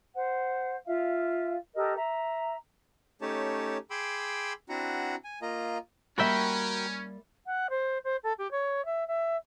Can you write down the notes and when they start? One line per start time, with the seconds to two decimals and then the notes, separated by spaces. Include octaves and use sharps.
0.14 C5 F#5
0.86 F4 E5 F5
1.75 G4 A4 A#4 D#5
1.96 E5 A#5
3.21 A3 C#4 D#4 G4 C#5 A5
3.91 G#4 G5 B5 C6 D6 E6
4.69 C4 D4 E4 F#4 F#5 A#5
5.24 G#5
5.42 A#3 F4 D#5 A#5
6.18 G3 A#3 C#4 F#4 A#4 E5 G5 B5
7.46 F#5
7.70 C5
8.04 C5
8.23 A4
8.38 G4
8.51 C#5
8.85 E5
9.08 E5